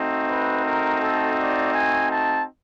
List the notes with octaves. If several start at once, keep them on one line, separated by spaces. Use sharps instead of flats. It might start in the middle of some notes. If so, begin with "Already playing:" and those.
Already playing: A3 C4 D#4 F#4
B4
A#4
A4
D5
G#5
A5